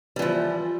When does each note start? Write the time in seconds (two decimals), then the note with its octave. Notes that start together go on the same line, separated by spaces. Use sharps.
0.16 G3
0.19 E3
0.22 F3